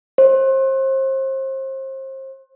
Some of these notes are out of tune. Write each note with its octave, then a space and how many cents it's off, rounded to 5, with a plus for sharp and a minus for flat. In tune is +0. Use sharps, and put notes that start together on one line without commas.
C5 +35